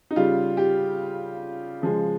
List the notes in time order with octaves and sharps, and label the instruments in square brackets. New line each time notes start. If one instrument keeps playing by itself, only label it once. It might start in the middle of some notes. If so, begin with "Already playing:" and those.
[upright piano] D#4
C#3 G3 F4
G4
C#3 F3 G#3